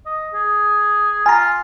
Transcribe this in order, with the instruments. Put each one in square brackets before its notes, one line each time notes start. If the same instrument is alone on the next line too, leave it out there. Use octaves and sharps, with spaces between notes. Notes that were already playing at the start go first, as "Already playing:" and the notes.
[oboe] D#5
G#4
[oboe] F4 [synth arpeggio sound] G#5 A#5